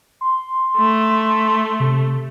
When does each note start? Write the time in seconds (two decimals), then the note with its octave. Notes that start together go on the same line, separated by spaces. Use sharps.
0.21 C6
0.77 A3
1.80 C3